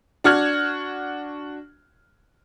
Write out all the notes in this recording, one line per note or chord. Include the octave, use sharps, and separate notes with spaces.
D4 F#4 F6 G#6